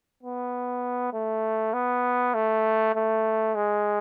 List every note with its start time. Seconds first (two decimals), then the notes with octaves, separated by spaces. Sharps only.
0.23 B3
1.14 A3
1.74 B3
2.34 A3
2.95 A3
3.55 G#3